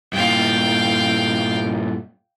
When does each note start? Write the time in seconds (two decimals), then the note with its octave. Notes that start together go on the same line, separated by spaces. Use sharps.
0.13 G2 A#2 F5 G5